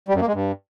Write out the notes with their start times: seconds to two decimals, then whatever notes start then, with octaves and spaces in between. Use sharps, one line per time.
0.08 G3
0.15 F#2
0.21 A#3
0.27 G#3
0.34 G2